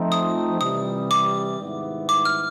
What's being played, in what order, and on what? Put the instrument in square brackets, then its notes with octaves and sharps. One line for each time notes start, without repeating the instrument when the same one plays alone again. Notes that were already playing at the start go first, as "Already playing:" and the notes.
Already playing: [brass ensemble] F3 A3 C4 D#4
[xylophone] D#6
[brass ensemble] C3 E3 G3 [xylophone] D#6
[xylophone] D6
[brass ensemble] G#2 D#3 G3 B3 E4
[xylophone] D6
F6